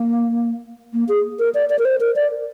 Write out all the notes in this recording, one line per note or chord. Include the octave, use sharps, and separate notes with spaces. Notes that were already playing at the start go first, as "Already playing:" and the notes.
Already playing: A#3
A#3
G#4
A#4
D5
D5
A#4
C5
A#4
D5